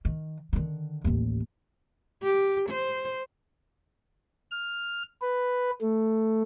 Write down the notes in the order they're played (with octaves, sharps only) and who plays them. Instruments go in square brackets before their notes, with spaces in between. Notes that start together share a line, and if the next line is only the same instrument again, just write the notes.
[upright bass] D#3
D3 D#3
A1 D#2
[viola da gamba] G4
C5
[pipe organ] F6
B4
A3